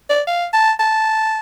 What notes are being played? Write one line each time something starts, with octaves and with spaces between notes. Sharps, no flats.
D5
F5
A5
A5